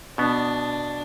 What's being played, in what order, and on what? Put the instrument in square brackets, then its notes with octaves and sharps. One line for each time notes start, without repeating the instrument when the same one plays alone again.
[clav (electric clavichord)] B2 B3 [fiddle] D4